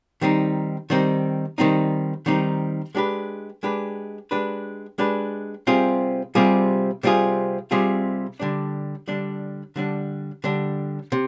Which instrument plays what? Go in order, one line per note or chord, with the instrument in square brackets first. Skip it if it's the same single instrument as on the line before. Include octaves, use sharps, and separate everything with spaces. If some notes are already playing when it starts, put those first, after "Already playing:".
[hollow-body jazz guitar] D#3 G3 C4 D#4
D#3 G3 C4 D#4
D#3 G3 C4 D#4
D#3 G3 C4 D#4
G#3 D4 G4 B4
G#3 D4 G4 B4
G#3 D4 G4 B4
G#3 D4 G4 B4
C3 G3 C4 F4 G#4
C3 G3 C4 F4 G#4
C3 G3 C4 F4 G#4
C3 G3 C4 F4 G#4
D3 G3 D4
D3 G3 D4
D3 G3 D4
D3 G3 D4
C3